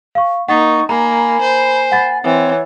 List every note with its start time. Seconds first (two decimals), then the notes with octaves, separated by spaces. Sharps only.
0.15 F5 C#6
0.48 A#3 D#4 F#5 C#6 A6
0.89 A#3 G#5 A#5 B5
1.41 C5
1.92 F#5 B5 A6
2.24 E3 C4 C#5